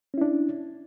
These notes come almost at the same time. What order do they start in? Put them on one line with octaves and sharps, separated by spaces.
C#4 E4 D4